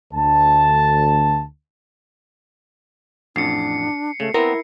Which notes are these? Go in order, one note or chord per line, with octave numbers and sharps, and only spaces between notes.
D2 A5
A1 F2 D4 C7 C#7
C#3 A3
B3 C4 E4 A#4